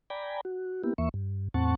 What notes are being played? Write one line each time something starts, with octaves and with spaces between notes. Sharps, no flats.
D5 G5 G#5 A#5 B5
F#4
A#3 B3 E4 G4
D#2 E3 A#3 E5 C#6
G2
E2 A2 C4 F#5 A5 C#6